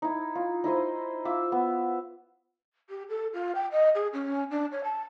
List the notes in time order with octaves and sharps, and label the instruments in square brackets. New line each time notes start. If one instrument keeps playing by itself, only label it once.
[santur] D#4 E4
F4
D#4 E4 C5 D#5
F4 E5 D6 E6
B3
[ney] G4
A4
F4
G5
D#5
G#4
C#4
D4
C#5
A5